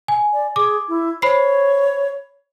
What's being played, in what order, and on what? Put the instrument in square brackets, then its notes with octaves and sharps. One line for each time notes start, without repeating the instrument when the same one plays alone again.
[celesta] G#5
[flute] D5
[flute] G#4 [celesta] D6
[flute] E4
[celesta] C5 B5 C7 [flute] C#5